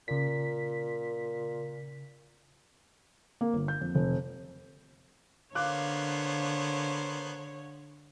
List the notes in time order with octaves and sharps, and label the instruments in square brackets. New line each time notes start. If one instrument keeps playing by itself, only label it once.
[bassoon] A#2 [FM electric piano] C#3 B6
[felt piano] A#3
G1
G6
F2
F1
[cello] D3 [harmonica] A#3 B3 C5 [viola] C#5 [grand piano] F5 D6 F#6